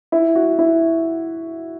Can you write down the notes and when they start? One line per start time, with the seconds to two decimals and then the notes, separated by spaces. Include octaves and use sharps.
0.12 E4
0.35 F#4
0.59 E4